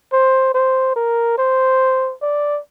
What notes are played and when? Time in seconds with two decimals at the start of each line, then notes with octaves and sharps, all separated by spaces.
0.12 C5
0.54 C5
0.96 A#4
1.38 C5
2.22 D5